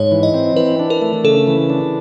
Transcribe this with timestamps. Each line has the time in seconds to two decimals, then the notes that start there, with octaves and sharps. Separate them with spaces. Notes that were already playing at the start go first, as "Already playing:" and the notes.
Already playing: G#2 C#5
0.12 E3
0.23 D#5
0.34 C4
0.56 E3 B4
0.80 D4
0.90 A#4
1.02 A3
1.24 C#3 A4
1.47 E3
1.70 D4